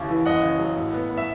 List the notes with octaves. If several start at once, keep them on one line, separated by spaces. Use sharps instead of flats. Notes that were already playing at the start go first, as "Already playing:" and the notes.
Already playing: D#2 C#3 E4
E3
F#1 D#5 F#5
C#3
F#3
A2
B3
B3
E5